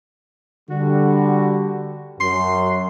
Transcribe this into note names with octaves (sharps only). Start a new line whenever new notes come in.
D3 G3 F#4
F#2 C6